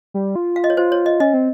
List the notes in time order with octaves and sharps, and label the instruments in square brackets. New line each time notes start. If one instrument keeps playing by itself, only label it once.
[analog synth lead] G3
F4
[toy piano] F5
D#5
C#5
[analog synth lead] F4 [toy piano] C5
[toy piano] C#5
D#5
[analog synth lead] C#4 [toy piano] D#5
[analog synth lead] C4